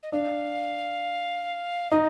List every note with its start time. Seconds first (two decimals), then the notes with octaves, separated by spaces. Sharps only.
0.03 D#5
0.12 D4 F5
1.91 D#4 D#5